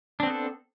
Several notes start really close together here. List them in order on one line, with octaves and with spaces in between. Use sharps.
D4 C4 B3 A4